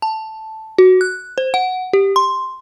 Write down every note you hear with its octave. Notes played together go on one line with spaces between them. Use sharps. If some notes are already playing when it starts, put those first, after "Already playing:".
A5
F#4
F#6
C5
F#5
G4
C6